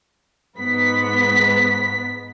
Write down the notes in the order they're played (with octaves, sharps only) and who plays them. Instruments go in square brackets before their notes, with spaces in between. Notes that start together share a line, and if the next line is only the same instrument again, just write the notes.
[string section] G#2 B3 B6